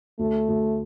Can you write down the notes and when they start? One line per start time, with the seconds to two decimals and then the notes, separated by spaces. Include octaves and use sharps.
0.19 D2 A3
0.48 D2